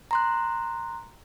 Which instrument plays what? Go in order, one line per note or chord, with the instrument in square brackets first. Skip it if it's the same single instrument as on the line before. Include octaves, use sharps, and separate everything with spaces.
[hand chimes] A#5 C6 F#6